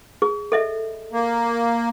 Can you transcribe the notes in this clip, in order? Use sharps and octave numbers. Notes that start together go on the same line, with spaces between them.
G#4
A4 D#5 E5
A#3